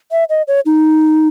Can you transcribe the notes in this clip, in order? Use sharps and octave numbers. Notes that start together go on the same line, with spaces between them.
E5
D#5
C#5
D#4